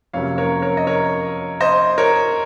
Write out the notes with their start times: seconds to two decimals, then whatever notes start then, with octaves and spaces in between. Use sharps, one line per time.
0.13 F2 C3 F#3 A#3 C#4 C#5 F5
0.38 A#4 C#5
0.62 A#4 C#5
0.77 D#5
0.87 A#4 C#5
1.60 C5 D#5
1.98 A#4 C#5